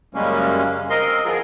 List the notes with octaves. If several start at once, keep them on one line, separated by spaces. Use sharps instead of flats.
F#2 C#3 G3 G#3 A#3 C#4
C4 A#4 D#5 C6
F3 B3 F4 G#4 A#4